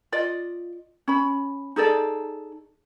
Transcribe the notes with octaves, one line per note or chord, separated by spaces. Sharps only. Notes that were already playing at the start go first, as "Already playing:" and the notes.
F4 D5 D#5
C#4 B5
D#4 G#4 A4 D5